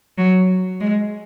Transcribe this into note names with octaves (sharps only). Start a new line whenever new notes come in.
F#3
G#3